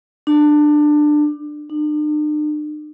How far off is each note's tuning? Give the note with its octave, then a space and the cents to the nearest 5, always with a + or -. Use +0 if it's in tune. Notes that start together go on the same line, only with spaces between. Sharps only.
D4 +20
D4 +45